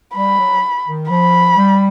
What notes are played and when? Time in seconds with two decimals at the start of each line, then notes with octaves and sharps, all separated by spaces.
0.16 G3 B5
0.39 F#3
0.87 D#3
1.10 F3 B5
1.57 G3